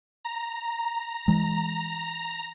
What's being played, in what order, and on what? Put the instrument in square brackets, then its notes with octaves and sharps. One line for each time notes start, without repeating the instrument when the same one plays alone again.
[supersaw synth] A#5
[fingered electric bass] E3 G#3